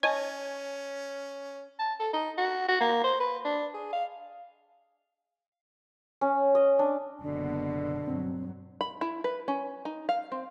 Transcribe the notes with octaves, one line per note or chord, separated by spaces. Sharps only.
C#4 C#5 D#5 G#5 A5
A5
A4
D#4
F#4
F#4
A#3
C5
B4
D4
G#4
F5
C#4
D#5
D4
F#1 B2 D3
G2 F#3 C4
B5
E4
B4
C#4
D#4
F5
C4